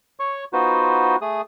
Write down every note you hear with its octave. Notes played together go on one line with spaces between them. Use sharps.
C#5 C#6
B3 D#4 F4 F#4 B4 C5
A3 G#4 D#6